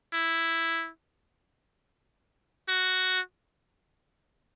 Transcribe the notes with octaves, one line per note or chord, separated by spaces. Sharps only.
E4
F#4